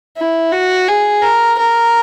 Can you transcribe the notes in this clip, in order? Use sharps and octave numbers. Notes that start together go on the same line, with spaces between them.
E4
F#4
G#4
A#4
A#4